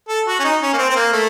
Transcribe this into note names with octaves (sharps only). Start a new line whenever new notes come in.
A4
F#4
C#4
D#4
C#4
A#3
C4
C4
A#3
A3